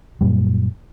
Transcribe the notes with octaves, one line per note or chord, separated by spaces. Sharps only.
F#2 A#2 G3